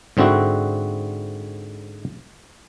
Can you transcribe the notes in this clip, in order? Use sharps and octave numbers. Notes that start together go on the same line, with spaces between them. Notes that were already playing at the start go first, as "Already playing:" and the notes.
G#2 D3 C4 E4 F#4